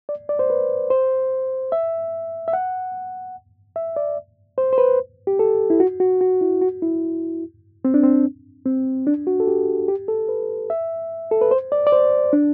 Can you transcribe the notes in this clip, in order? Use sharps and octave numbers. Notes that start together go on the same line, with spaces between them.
D5
D5
C5
B4
C5
E5
E5
F#5
E5
D5
C5
C5
B4
G4
A4
E4
F#4
F#4
F#4
E4
F#4
E4
C4
D4
C4
C4
D4
F#4
A4
G4
G4
A4
B4
E5
A4
B4
C5
D5
D5
C5
D4